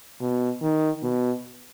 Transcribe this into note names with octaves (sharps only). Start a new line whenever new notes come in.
B2
D#3
B2